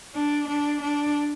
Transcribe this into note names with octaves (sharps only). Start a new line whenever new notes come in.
D4
D4
D4